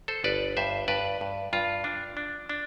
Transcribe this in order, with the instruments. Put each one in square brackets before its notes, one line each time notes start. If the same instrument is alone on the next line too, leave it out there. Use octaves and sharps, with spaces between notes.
[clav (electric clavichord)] A4 C5
G1 B4 D5
G2 C5 E5
G2 B4 D5
G2
G2 F4
D4
D4
D4